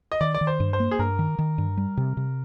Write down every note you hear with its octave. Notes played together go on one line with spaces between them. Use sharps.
D#5
D#3 D5
D5
D#3
C5
G2
C5
A#3
G#4
G2 A#4
D#3
D#3
G2
G3
C3
C3